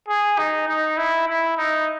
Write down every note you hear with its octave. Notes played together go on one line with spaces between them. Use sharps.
G#4
D#4
D#4
E4
E4
D#4